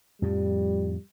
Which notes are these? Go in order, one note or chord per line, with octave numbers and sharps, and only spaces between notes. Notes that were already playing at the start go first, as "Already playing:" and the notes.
F2 A2 F3 G3